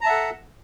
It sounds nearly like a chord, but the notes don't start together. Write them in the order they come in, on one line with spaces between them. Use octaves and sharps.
A#5 A5 E5 F#5 A4